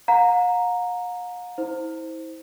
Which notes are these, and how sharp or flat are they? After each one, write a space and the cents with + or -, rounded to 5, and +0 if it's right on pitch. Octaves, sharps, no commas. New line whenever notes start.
F5 +45 A#5 +0
E4 -35 C5 +0